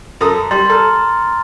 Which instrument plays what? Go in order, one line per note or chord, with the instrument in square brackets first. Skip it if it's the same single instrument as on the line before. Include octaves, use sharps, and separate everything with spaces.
[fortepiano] F#2 A4 D#6
[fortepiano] G3 [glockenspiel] C6 A6
[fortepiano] A4 [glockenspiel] A#5 F6